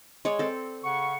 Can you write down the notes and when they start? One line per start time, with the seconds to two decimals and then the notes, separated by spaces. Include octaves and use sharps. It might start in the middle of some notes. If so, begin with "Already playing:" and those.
0.25 G#3 C#5 D5
0.39 C4 A4
0.84 C#3 F#5 C#6